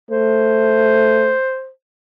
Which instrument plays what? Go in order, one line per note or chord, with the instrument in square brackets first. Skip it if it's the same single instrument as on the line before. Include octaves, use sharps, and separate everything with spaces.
[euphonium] A3 [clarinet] C5